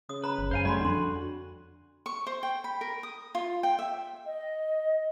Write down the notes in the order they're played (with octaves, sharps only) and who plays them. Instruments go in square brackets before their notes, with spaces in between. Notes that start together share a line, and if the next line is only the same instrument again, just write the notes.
[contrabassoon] C#3 [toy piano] D#6
[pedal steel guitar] B4 [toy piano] A#5 B5
[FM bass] G1
[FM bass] F#2 [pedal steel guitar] C5 F5 G#5
[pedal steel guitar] G3 A3 F#4 [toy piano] D5 B5 C6
[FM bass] F2 [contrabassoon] D3 [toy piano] D4 C6 [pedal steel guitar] F#4
[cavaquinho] C#6
C5
G5
B5
A#4
D#6
F4
G5
E5
[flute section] D#5